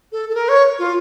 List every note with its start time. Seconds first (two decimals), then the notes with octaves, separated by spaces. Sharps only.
0.12 A4
0.29 A4
0.35 A#4
0.49 C#5
0.79 F4